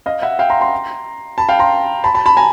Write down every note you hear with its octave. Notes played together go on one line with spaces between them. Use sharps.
D#5 F5
E5 F#5
F5 G5
A#5 C6
A#5 C6
A5 B5
F5 G5
A#5 C6
A5 B5
A5 B5
A5 B5
G#5 A#5